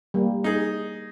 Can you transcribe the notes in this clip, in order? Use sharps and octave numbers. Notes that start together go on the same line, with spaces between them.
G3 A#3
D#4 G#4